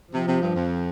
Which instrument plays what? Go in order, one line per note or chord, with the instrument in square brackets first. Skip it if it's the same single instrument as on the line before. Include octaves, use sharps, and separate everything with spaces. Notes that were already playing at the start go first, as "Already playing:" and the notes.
[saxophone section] C3 [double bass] F3
[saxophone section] C3
G2
F2